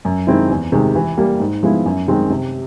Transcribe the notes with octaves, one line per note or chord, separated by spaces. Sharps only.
F#2
D#3 G#3 C4 E4
E2
C3 D#3 G#3
E3
G3 A#3
G#2
F3 G#3 B3 E4
F#2
D#3 G#3 C4
C3